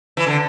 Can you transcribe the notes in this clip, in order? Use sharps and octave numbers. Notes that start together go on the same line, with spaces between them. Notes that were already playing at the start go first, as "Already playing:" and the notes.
E3
D3